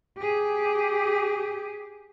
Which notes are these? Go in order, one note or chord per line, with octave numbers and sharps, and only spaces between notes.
G4 G#4